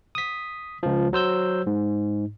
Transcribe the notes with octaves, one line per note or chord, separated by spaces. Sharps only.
D#6 B6
C#2 F3
F#3 C5 E6 G6
G#2